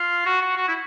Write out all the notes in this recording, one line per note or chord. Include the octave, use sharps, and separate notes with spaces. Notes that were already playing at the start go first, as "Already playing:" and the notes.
Already playing: F4
F#4
F#4
F#4
E4